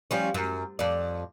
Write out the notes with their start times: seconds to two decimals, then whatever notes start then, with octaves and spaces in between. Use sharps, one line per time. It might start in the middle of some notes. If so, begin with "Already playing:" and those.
0.11 F3 G3 C#4
0.34 F#2
0.79 F2 D5